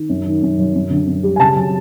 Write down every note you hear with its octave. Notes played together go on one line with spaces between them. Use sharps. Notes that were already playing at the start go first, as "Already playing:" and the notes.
Already playing: D#3
F#2
D#3
F#2
F#3
F#2
D3
F#2
G3
G#5
C#3 A5
F#3